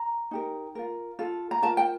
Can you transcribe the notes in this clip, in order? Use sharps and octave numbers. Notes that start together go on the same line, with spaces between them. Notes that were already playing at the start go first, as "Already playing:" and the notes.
Already playing: A#5
D#4 G4 A#4
F4 A#4
F4 A4
A#5
F4 A#4 A5
G5